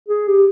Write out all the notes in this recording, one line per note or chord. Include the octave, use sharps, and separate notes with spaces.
G#4
G4